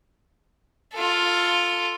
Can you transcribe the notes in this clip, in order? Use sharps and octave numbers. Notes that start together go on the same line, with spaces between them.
F4 A4